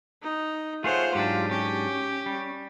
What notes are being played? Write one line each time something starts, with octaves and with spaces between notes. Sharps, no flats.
D#4
A3 F4 G#4 C5 C#5 F#5
G#2 F#3 D4 G4
C#4 G4
G3